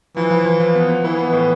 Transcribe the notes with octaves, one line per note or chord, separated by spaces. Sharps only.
E3 F3
F3
F3
F3
B3
B3
E3 E4
B3
A2